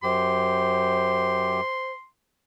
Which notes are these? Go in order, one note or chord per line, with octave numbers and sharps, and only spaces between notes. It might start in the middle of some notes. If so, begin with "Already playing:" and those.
F#2 G4 C5 C6